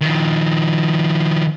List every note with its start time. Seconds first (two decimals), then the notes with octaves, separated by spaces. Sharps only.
0.01 D#3 F3